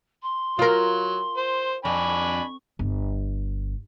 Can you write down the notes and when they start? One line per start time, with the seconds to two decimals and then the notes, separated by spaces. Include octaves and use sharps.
0.22 C6
0.59 F#3 F4 A#4
1.37 C5
1.85 F2 D4 G#5 B5 C#6
2.79 G1